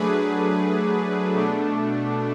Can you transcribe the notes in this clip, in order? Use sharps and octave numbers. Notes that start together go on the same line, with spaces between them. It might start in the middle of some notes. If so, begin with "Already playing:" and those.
Already playing: F#3 A3 D4 G#4 B4
B2 A3 D4